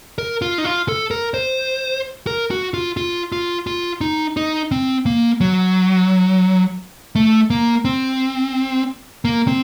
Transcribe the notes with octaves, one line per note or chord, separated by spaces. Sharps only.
A#4
F4
D#4
F4
A4
A#4
C5
A#4
F#4
F4
F4
F4
F4
D#4
D#4
C4
A#3
F#3
A3
A#3
C4
A#3
C4